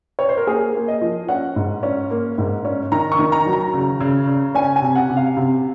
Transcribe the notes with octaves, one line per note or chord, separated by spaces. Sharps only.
C#5
C5
A#4
A#3 G#4
A#3
D#5
F3
C#4 F#5
G#2
C#4
A#3
G#2
C#4
D#3 A#5
C#6
D#3
A#5
F#3
A#5
C#3
C#3
C#3
C#4 G#5
G#5
C3
F#5
C3
F5
C3